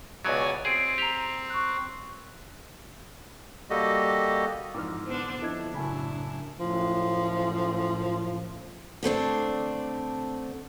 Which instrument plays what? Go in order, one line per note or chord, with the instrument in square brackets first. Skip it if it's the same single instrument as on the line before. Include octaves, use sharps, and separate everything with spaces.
[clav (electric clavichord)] C#2 B2 F#3 [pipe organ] C#5 D5 G#5
[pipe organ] C4 [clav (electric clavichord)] G#4 [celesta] C7 D7 D#7
[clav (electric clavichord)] G4 [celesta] A#5 F7
[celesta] C#6 F#6
[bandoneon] G3 A#3 F#4 G4 A4 D#5
[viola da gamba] F2 [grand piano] G#2 E3 [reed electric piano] D6 E6 F6
[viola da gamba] D3 B3 D4 [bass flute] C5
[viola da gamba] F2 [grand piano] C4 A4 [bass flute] D4 [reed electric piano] E4 D#5 G#6
[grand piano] F#2 G#5 B5 [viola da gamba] A2 E4 [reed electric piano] C#3
[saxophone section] F#2 A2 F3
[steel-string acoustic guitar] D3 A3 C4 D4